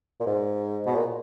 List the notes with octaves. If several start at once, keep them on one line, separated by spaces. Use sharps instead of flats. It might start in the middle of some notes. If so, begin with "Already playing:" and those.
A#2
G#2
B2
A#2